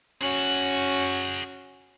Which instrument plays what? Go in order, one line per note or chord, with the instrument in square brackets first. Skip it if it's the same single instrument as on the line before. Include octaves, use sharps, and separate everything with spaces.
[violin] C#4 F#4 [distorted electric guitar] G#4 F#5